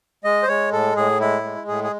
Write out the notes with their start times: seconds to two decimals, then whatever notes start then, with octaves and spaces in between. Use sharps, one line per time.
0.24 G#3 D#5
0.43 C5
0.48 G#3 C#5
0.72 A2 A4
0.96 A2 G#4
1.20 G#3 E4
1.44 G#3
1.68 A2 G#4
1.84 G#4